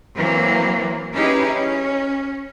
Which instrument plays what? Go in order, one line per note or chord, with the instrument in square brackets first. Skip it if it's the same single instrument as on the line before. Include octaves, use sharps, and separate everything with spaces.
[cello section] E3 F#3 A#3 C4
C#4 D#4 E4 G4 G#4 B4
C#4